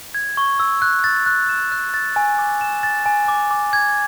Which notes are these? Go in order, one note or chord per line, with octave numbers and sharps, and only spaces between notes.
G#6
C#6
E6
F#6
A6
F#6
E7
F#6
A6
G#5
D6
E7
A6
G#5
D6
D6
G#6